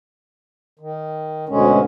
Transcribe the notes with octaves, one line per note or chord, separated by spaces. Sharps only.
D#3
D2 G#2 B2 D3 G#3 C#4